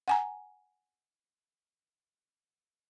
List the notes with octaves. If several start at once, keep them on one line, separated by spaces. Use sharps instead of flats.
F#5 G#5 A#5